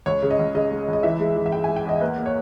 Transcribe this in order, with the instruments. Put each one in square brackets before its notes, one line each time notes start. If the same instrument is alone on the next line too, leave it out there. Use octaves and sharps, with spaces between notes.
[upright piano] C#2 C#5
C#3
D#5
C#2
C#3 D#5
G#3
C#2
D#5
E3 E5
G#3
E3
E5
G#3 G5
G#5
G#3
G5
E2 D#5
A#3 B4
A#3
C#5